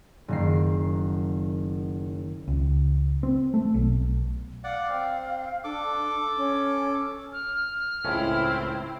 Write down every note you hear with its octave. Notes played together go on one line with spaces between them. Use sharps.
F#1 D#3 C7
C#2
C4
A3
B1
D5 F5 F#5
C4
D4 A4 D6
C#4
F6
C#2 A2 C4 C#4 E4